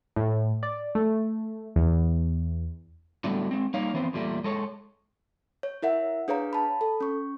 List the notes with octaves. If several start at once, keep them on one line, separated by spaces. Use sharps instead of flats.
A2
D5
A3
E2
A2 D3 F#3 G3 A3 B3
G#3 C4
G3 A#3 D#4 C#5 F5
E3 B3 C4 C5
E2 A#2 G3 A3
G#3 A4 C#5
C#5
E4 A#4 E5 F#5
D4 G#4 B4 C#5 F5 A#5
A5 B5
A4
C#4 C#6